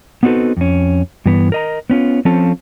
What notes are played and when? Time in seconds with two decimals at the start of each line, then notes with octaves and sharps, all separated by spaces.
0.23 B3 C4 D#4 F#4 A4 B4
0.57 F2 C#4
1.26 G2 E3 B3
1.52 A#4 D#5 A#5
1.90 B3 C#4 F4
2.25 F3 C4 C#4 F4 A4 A5